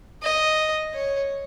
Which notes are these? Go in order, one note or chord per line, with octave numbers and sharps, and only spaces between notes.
D#5
C#5